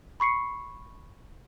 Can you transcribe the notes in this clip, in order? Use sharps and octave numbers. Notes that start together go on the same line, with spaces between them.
B5 C#6 C7 C#7